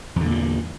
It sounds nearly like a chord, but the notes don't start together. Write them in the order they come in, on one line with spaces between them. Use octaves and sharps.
E2 D3 A#2 G2